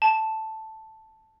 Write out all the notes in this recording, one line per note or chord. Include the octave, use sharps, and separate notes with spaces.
A5